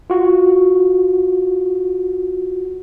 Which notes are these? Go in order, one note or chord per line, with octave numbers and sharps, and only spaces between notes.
F4 F#4